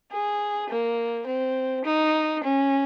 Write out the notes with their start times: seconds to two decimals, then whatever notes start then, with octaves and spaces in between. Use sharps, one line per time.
0.11 G#4
0.70 A#3
1.26 C4
1.85 D#4
2.43 C#4